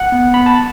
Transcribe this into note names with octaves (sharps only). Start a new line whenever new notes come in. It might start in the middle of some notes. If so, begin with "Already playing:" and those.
Already playing: F#5
B3
B3 B5
A5